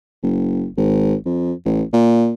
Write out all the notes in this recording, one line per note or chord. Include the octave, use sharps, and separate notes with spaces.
F#1
G#1
F2
A1
A#2